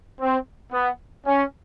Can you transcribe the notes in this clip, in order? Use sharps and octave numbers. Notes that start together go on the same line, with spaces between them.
C4
B3
C#4